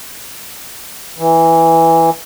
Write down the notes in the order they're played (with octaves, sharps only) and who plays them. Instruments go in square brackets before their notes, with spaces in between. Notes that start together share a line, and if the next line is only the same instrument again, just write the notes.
[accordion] E3